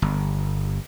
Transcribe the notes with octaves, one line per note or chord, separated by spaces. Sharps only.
G1